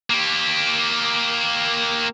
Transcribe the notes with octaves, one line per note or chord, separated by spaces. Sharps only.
A#3 G4